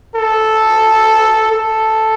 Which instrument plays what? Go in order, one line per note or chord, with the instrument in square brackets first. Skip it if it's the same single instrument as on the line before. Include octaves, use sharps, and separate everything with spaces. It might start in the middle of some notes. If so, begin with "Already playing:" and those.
[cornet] A4
A4